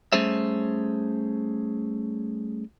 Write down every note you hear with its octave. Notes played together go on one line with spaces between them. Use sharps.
G3 A3 C#4 G#4 C5 E5